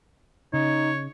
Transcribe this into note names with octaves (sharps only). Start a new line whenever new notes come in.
C#3 D#4 C#5